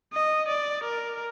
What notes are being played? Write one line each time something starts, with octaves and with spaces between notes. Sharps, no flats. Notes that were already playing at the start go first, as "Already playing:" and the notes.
D#5
D5
A#4